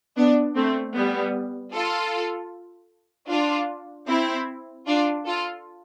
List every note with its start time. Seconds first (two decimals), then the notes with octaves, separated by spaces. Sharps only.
0.17 B3 D4
0.56 A3 C4
0.95 G3 B3
1.74 F4 A4
3.30 D4 F4
4.08 C4 E4
4.87 D4 F4
5.26 F4 A4